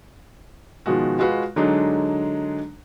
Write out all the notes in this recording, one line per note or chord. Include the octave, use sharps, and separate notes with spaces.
B2 D#3 F3 G#3 F#4
G#3 F4 F#4 B4
D3 F#3 G#3 D4 D#4